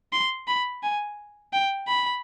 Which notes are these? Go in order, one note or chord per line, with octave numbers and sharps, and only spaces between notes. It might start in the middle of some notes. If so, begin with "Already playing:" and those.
C6
B5
G#5
G5
B5